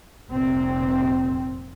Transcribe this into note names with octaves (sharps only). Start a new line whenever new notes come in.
F1 C2 A#2 C4